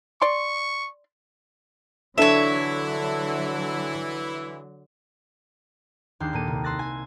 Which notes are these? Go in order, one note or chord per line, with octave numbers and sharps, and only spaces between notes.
D5 C6 C#6
D3 E3 F#3 D4 E4 A4 C#5 E5
D#2 G#3 D4 G6 C7
A#2 A#3 A4 D#7
C2
C6 E6 F#6 A6 A#6
G#5